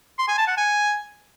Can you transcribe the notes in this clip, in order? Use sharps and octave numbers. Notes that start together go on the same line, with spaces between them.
C6
G#5
A5
F#5
G#5